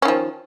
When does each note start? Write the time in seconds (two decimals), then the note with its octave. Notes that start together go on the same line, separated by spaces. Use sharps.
0.02 C#4
0.05 D#3
0.08 F3